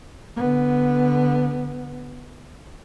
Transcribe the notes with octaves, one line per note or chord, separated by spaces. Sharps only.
D3 B3